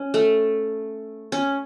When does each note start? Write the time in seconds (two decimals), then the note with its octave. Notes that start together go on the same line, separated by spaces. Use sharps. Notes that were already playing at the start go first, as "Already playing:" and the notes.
Already playing: C#4
0.14 A3
1.32 C#4